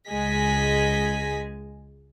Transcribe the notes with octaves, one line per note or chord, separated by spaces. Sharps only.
C#2 G#3 G#4 D#5 G#5 B6